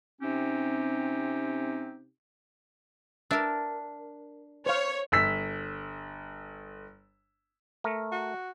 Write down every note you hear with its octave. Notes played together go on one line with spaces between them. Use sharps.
C3 C4 C#4 D#4 G4
D4 A#4 E5 E6
C5 C#5 F5
G1 E6 B6
A3 A#4
F#4